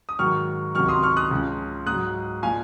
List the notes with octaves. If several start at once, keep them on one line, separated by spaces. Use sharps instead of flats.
D#6
G#2 D#3 F#3 C#6 F6
C#2 C3 D#3 F#3 C#6 F6
C6 D#6
C#6 F6
D#6 F#6
C#2 C#3 F3
G#2 D#6 F#6
F#3
A#2 F3 F5 G#5